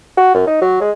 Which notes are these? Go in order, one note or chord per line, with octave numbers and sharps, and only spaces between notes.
F#4
F#2
D#4
F#3
G#3